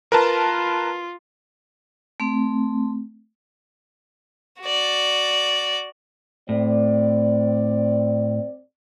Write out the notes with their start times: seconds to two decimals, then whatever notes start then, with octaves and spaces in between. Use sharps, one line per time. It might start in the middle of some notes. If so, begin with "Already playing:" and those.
0.12 F4 A#4 B4 A5
2.20 A3 C4
4.62 F#4 D5
6.49 A2 C4 D5